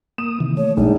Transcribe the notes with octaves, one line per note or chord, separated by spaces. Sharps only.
A#3 D#6 E7
C3 D#3 E3
A3 C#5
A#1 G#2 D#4